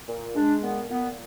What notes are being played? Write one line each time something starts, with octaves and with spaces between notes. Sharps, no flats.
A#2
G#3 D4
A#2 B3
A#2 B3